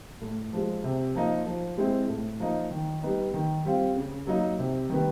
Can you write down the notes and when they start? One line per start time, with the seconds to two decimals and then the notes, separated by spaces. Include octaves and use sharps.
0.21 A2
0.53 F3 G#3
0.84 C3
1.15 F3 A#3 D#4
1.47 F3
1.78 G#3 C4 E4
2.09 A2
2.40 F3 A#3 D#4
2.71 D#3
3.03 G3 B3 D#4
3.34 D#3
3.65 G3 C4 F4
3.96 C#3
4.27 F#3 A#3 D#4
4.58 C3
4.90 D#3 G3 B3